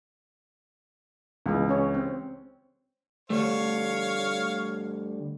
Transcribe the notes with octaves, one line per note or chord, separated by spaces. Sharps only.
C#2 E3 G#3
C#4 C#5
C4
D2 G3 A3 C#5 F5